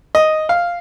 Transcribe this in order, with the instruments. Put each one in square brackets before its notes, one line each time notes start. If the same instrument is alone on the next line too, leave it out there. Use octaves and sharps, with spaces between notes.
[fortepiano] D#5
F5